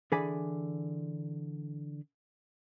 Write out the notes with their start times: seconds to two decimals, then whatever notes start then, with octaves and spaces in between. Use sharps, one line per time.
0.12 D3 E3 G#4 D5 G#5 B5